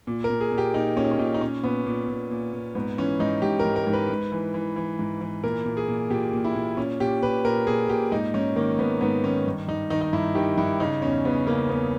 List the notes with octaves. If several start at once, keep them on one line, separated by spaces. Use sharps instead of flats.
A#2
A#4
A#2
G#4
A#2
G4
A#2 D#4
A#2 C#4
D#4
C#4
A#2 D#4
D#4
A#2 C#4
A#2 B3
A#2
A#2
A#2
A#2
G#2 B3
E3 C#4
G#2 D#4
G#2 G4
A#4
G#2
A#4
G#2
B4
G#2
E3
E3
E3
G#2
E3
A#2 A#4
A#2
G#4
A#2
A#2 G4
A#2
E4
A#2
A#2 C#4
A#2 G4
A#2 B4
A#2 A#4
A#2 G#4
A#2 G4
G#2 D#4
G#2 C#4
D#3 A#3
G#2 B3
G#2 B3
D#3 C#4
G2
G2 D#4
D#3 D#4
D#4
G2 E4
D#3 G4
G2 E4
C#3 D#4
E2 C#4
C#3 B3
C#3 A#3
E2 B3